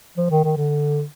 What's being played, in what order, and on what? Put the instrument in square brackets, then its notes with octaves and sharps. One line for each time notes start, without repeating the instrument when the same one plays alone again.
[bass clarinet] F3
D#3
D#3
D3